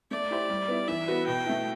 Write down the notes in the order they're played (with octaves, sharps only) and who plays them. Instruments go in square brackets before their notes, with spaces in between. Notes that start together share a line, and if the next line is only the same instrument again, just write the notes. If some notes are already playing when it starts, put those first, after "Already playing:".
[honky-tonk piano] A3 [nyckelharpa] D5
[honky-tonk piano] E4 G4 C5
G3
B3 E4
[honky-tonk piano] E3 [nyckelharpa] E5
[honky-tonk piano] B3 F#4 B4
[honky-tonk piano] B2 [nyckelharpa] G5
[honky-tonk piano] A3 E4